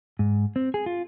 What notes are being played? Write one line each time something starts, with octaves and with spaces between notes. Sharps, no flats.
G#2
C4
G#4
F4